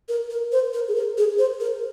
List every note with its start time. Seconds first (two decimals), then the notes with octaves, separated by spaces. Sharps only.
0.09 A#4
0.30 A#4
0.52 C5
0.73 A#4
0.88 G#4
0.96 A#4
1.18 G#4
1.39 C5
1.60 A#4